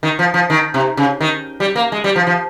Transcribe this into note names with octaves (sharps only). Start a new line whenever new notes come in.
D#3
F3
F3
D#3
C3
C#3
D#3
G3
A#3
G#3
G3
F3
F3